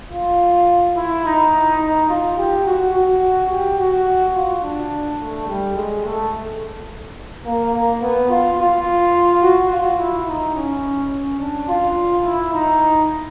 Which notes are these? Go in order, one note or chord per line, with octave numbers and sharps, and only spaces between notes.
F4
E4
D#4
D#4
F4
G4
F#4
F#4
G4
F#4
F4
D4
A3
G3
G#3
A3
A#3
A#3
B3
F4
F4
F#4
F4
E4
D#4
C#4
C#4
D4
F4
E4
D#4